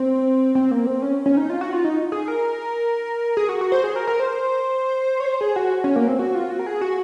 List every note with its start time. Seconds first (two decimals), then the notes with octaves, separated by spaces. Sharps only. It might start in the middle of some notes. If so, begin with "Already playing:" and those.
Already playing: C4
0.55 C4
0.71 A#3
0.87 C4
1.02 C#4
1.26 C#4
1.37 D#4
1.50 F4
1.61 F#4
1.73 F4
1.85 D#4
2.12 G#4
2.28 A#4
3.37 G#4
3.49 F#4
3.61 F#4
3.72 C5
3.84 G#4
3.96 A#4
4.07 A#4
4.20 C5
5.20 C#5
5.26 C5
5.41 G#4
5.56 F#4
5.84 C#4
5.96 A#3
6.08 C4
6.19 F#4
6.35 F4
6.50 F#4
6.59 A#4
6.66 G#4
6.81 F#4